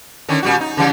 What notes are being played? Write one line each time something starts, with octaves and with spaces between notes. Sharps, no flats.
D3 D#3 C#4
A#2 G3 F#4
D#4
C#3 E3 G3